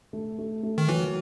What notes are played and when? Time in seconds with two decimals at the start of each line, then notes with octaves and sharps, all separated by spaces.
0.13 A3
0.39 A3
0.63 A3
0.78 D#3
0.89 E3 F#3